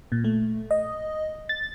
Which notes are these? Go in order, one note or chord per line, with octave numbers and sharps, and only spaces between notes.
A#2
A3
D#5
A6